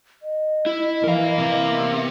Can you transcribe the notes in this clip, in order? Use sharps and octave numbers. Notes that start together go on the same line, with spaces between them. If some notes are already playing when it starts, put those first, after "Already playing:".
D#5
E4
E3 A#4 F5
C3
B3 E5